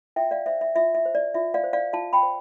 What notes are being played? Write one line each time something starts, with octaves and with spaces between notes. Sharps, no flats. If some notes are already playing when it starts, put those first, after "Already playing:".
F4 E5 G5
D5 F5
C5 E5
E5
F4 E5
E5
C5
D5
F4 E5
D5 F5
C5
D5 F5
F4 F5 A5
G5 B5
C5